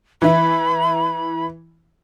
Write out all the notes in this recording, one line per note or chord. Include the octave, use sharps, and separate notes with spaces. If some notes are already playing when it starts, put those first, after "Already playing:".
E3 E4 B5